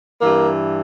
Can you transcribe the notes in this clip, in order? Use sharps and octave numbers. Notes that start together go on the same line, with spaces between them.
G2 E3 A#3